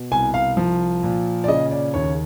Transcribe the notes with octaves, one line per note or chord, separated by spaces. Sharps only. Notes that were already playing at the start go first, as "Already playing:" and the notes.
Already playing: B2
C2 G#5
F5
F3
A#2
D5
C#3 D#5
D5
D#2 C#5